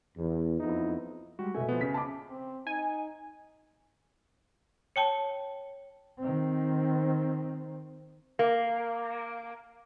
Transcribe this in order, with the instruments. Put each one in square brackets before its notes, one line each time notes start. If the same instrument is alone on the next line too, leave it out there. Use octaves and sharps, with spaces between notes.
[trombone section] E2
F2 B3 D#4 E4
[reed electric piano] G3 G#3 G4 [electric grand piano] F#4
[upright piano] B2 A3 [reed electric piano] E5 G#5
[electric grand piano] F3 B3
[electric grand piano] C#3 [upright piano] C#4 B6
[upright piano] A5 B5 D6
[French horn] C4
[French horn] D#4 [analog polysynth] G#5
[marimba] C#5 G5 A5
[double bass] D#3 C4
[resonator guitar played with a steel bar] A#3